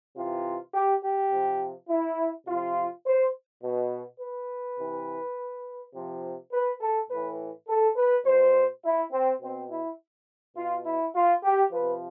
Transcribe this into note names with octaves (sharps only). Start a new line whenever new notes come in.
C3 E3 F4
G4
G4
C3 F3
E4
C3 F3 F4
C5
B2
B4
C3 E3
C3 F3
B4
A4
A2 E3 B4
A4
B4
B2 C5
E4
C4
B2 C4
E4
B2 F4
E4
F4
G4
C3 F3 B4